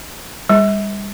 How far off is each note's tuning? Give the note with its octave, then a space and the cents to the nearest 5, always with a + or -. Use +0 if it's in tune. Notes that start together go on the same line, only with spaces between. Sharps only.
G3 +40